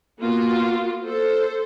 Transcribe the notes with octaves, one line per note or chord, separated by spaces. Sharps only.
A#3 B3 F4 F#4
A4 C5